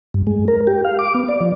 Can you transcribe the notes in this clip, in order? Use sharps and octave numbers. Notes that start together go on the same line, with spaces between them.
G2
G#3
A#4
G4
F5
D6
B3
D5
F3